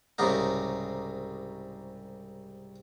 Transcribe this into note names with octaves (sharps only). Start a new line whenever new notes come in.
C2 G#2 C#3 D#4